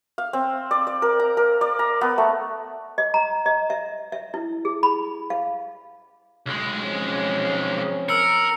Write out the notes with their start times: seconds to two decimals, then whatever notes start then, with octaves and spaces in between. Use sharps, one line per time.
0.18 F5
0.33 C4
0.71 D5
0.87 D5
1.02 A#4
1.20 A#5
1.37 A#4
1.61 D5
1.79 A#5
2.01 B3
2.18 A3
2.98 D#5
3.14 A#5
3.46 D#5
3.70 E5
4.12 E5
4.34 E4
4.65 G#4
4.83 B5
5.30 F5
6.46 B1 G#3
6.82 F3 C4 C#4
8.09 A#4 E6 C#7